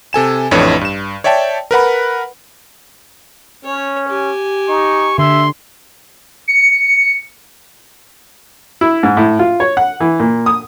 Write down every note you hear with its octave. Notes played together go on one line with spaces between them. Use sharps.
C3 A4 G#5 E7
A1 F2 A2 D4 B4 C#5
G2 E7
C#5 D5 E5 G5 A5
A#4 B4 F#5 B5
C#4 C#5
G4 G#5
D#4 C#6
D3 E5 C6
C#7
E4
G#2
A2
F4
C#5
F#5
E3
A#2
D#6